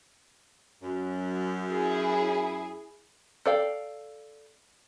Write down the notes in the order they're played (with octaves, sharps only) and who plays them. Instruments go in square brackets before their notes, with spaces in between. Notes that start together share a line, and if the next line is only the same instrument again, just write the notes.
[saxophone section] F#2
[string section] E4 G#4
[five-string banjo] A4 D5 F5 G5